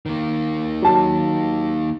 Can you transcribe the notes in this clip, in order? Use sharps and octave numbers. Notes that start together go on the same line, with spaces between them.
D#3 A#3
F#3 A5